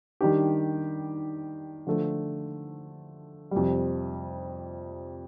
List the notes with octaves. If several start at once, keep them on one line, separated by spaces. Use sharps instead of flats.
D#3 G3 D4 G4
D3 F3 A3
F2 C3 G3